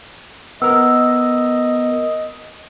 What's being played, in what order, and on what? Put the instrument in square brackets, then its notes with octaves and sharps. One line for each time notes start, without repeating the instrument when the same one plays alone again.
[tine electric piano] B3 A#4 [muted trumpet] D#5 [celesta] E6